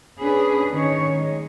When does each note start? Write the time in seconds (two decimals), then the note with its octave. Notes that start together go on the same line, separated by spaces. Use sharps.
0.19 C#4 D4 G#4 B4
0.70 D#3 C#4 C#5
1.13 G#3